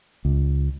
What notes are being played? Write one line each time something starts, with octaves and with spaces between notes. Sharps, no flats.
C#2